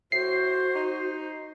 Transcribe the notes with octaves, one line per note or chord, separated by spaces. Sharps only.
A2 F#4 C5 C7
D#4